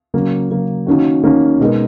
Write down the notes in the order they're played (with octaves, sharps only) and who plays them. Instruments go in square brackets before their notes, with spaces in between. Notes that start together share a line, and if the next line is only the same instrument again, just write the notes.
[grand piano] C#3 F#3 A#3
C#3 F#3 A#3
D#3 A#3 C#4 F#4
D#3 A#3 C#4 F#4
B2 G#3 D#4 A#4